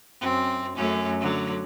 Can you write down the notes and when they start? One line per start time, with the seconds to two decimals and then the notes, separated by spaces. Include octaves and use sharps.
0.21 F#2 C4
0.76 F#2 A3 C#4
1.20 D3 F#3